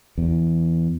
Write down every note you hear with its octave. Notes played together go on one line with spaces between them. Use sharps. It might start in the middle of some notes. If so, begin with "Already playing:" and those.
E2